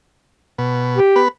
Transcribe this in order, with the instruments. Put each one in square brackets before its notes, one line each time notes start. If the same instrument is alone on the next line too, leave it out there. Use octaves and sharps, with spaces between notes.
[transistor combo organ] B2
[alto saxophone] G4
[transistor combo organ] B3 B4